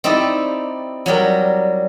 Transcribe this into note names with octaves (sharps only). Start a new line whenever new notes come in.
C4 D#4 E4 G4 D5
F#3 G3 G4 A#4